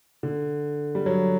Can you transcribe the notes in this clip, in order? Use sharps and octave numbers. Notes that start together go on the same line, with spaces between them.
D3
G3
F#3